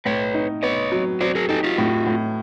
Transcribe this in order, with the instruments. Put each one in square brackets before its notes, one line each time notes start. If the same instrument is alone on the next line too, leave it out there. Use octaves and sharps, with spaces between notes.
[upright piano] A2 [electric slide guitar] B4 C#5
[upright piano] D#4
[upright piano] B3 [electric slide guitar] C#5 D#5
[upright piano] F#3
[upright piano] F#3 [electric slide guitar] C5 D5
[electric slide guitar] G#4 A#4
[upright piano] D#4 [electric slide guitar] G4 A4
[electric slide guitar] F4 G4
[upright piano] A2
A2